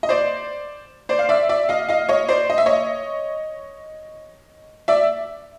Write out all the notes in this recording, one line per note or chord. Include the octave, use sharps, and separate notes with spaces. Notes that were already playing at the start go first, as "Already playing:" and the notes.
D#5
C5 D5
C5 D5
F5
D5 E5
D5 E5
D#5 F5
D#5 F5
C#5 D#5
C5 D5
D#5
E5
C#5 D#5
D5 E5